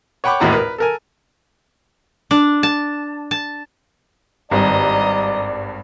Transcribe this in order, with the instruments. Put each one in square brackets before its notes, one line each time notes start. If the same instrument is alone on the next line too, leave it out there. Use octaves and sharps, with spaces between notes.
[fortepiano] C#5 F#5 G5 B5 C#6 D6
G#1 D#2 A2 E4 F#4 A#5
A#4 B4
A4 A#4 G#5
[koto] D4
A5
A5
[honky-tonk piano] G#1 G2 [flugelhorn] D5 [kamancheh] D#5 A#5